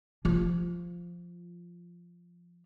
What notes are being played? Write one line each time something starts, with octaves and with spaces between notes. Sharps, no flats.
F3 F4